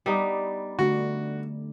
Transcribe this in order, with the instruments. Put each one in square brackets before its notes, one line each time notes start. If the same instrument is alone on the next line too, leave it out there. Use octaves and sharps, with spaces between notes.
[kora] G3 B3 D#4 [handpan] D5
[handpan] D3 A3 D4 [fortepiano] F#4